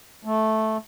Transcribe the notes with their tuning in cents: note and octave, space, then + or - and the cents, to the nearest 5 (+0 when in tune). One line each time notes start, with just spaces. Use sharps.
A3 -10